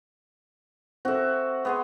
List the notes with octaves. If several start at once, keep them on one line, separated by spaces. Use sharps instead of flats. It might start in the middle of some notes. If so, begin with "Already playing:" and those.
C4 F#4 A4 E5
B3 G#4 C6